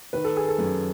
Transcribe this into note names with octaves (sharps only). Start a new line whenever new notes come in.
D#3 B4
A4
G#4
A4
F#2